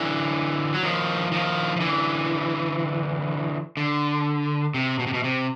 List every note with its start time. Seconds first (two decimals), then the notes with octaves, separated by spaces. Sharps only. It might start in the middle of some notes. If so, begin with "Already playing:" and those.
Already playing: D3 E3
0.74 F#3
0.83 D#3 F3
1.32 D#3 F3
1.76 F3
1.80 D3 E3
3.77 D3
4.74 C3
4.99 B2
5.07 C3
5.14 B2
5.24 C3